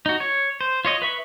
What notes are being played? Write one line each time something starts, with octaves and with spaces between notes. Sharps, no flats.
D#4 F#4
C#5
C5
F4 C#5 D#5
B4 E5 C#6